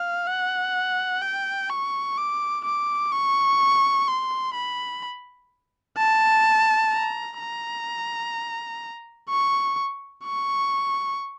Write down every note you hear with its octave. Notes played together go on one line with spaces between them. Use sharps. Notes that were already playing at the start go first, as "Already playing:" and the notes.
Already playing: F5
F#5
G5
C#6
D6
D6
C#6
C6
B5
A5
A#5
A#5
C#6
C#6